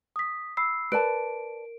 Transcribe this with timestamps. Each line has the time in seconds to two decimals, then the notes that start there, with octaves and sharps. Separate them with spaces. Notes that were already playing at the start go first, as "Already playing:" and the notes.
0.16 D#6 B6
0.57 B5 E6 C7
0.92 A#4 B4 D5 A5 D7